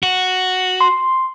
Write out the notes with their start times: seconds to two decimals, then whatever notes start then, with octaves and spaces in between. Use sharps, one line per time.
0.03 F#4
0.81 C6